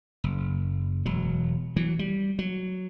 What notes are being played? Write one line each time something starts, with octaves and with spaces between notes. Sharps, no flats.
F#1
E1 F#3
E3 F#3
G3
F#3